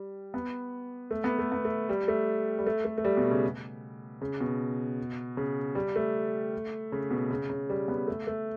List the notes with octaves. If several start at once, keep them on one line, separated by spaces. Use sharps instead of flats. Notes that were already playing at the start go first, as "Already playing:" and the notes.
Already playing: G3
B3
A3
B3
A3
B3
A3
G3
A3
G3
A3
A3
A3
G3
B2
C#3
C#3
B2
C#3
G3
A3
C#3
B2
C#3
C#3
G3
B3
A3
A3